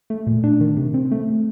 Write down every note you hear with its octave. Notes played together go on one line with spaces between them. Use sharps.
A3
A#2
D4
D#3
C3
C4
A3